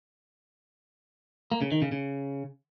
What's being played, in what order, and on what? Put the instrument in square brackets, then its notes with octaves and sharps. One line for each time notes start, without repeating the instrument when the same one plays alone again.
[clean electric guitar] A#3
C#3
D#3
C#3
C#3